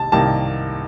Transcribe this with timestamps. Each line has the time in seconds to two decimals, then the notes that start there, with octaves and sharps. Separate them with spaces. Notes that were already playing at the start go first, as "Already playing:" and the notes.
Already playing: C2 C3 D#3 A5
0.12 C2 C3 D#3 G3 A#3 A5